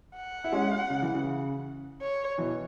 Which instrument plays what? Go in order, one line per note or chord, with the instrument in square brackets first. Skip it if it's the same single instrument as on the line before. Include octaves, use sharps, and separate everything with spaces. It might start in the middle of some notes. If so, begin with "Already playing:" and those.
[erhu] F#5
[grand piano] E4
G#3 C#4
C#3
E3
C#3
[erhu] C#5
[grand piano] B2 E3